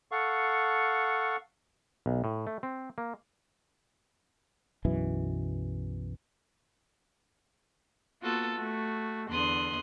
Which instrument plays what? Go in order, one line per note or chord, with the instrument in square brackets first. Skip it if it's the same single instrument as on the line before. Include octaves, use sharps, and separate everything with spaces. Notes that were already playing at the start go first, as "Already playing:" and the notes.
[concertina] A4 F5 F#5 C#6
[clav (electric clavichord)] B1
A2
A3
C4
A#3
[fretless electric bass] B1 F#2 B2 E3
[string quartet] A#3 B3 F4 F#4 A4
A3 F#4
E2 D3 C6 D#6 F#6